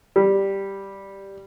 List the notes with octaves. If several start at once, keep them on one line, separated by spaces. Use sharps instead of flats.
G3